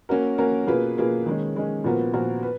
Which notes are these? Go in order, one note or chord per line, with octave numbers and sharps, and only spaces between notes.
A#3 C#4 F#4 A#4
A#3 C#4 F#4 A#4
B2 A#3 F4 G#4 B4
B2 A#3 F4 G#4 B4
D#3 G#3 C#4
D#3 G#3 C#4
A#2 F3 B3 F#4 A#4
A#2 F3 B3 F#4 A#4
B4